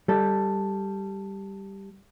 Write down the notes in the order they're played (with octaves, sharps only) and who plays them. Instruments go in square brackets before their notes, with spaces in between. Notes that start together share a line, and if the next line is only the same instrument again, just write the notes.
[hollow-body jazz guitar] G3 A4